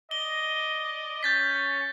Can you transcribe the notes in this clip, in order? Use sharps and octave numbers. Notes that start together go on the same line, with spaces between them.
D5 D#5 G7
C#4 G6 A6 B6